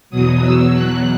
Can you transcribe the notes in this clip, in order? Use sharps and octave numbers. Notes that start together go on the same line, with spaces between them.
E2 B2 F#3 D#6
E6
F#6